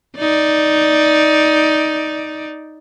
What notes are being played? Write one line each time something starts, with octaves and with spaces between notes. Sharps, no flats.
D#4 D5